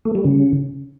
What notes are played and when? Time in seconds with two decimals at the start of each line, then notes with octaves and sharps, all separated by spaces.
0.05 A3
0.15 G3
0.25 C#3